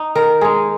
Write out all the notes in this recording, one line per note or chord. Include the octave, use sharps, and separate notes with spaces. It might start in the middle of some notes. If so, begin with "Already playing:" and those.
Already playing: D#4
D#3 A#4
G#3 D#4 G#4